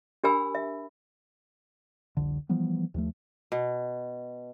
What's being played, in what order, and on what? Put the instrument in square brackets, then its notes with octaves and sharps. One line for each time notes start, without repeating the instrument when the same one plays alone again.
[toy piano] D4 G4 A#4 G#5 B5 E6
E5
[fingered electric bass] F1 C2 D3
E3 F3 G3 B3
D#2 F3 A3
[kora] B2